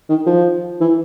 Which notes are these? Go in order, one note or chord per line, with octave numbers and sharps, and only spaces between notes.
D#3
F3
E3